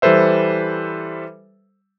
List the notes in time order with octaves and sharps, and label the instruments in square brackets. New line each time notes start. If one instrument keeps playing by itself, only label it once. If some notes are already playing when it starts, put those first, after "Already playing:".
[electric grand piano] E3 G3 A4 B4 C5 E5